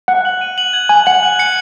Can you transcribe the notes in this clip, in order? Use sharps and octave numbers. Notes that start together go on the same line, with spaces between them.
F#5 F#6
F#7
D#7
F#7
G#6
G#5 F#7
F#5 F#7
F#6
C#7